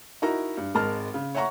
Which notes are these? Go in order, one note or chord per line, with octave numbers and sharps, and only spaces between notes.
D#4 E4 F#4 A#4 E5 A#5
G2
G#1 G#3 A#4 A5 F6
C#3
C#5 E5 F#5 A#5 C#6